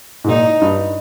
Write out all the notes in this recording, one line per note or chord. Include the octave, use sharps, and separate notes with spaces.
G#2
A#2 D#4
G2